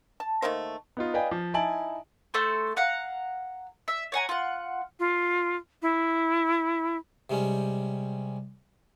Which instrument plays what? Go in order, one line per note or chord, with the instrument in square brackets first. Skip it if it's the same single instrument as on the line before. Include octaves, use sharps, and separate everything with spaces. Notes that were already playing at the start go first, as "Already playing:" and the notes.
[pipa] A5
D#3 A3 A#3 C5
[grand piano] B3 D#4 F4
B4 D5 D#5 F5 G5 G#5
F3
D#4 E4 G#5 A5 D7 F#7
[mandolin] A3 A4 C5
F5 F#5 A#5
E5
C#5 F#5 G#5 A#5
F4 F#5
[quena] F4
E4
[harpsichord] C3 G3 G#3 C#4